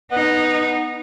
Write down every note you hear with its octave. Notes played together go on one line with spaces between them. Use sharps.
B3 D#4